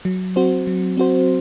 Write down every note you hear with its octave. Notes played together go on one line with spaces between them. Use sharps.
F#3
C4 F#4 C5
F#3
C4 F#4 C5